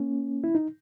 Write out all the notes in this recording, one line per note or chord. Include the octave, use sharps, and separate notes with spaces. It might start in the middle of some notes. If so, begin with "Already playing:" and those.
Already playing: A#3 C#4
E4
D#4